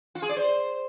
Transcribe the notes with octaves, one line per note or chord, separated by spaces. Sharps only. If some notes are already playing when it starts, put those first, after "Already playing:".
F4
G#4
D5
C5